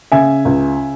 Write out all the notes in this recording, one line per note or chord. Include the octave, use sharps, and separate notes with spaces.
C#3 E5 G#5
C#2